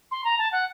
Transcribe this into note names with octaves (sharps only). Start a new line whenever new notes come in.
C6
A#5
A5
F#5